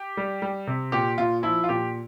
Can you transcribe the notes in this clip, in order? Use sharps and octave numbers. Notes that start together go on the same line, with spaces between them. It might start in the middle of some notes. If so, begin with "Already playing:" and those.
Already playing: G4
G3
G3
C3
A#2 G4
A#2 F4
F3 E4
F4
A#2 G4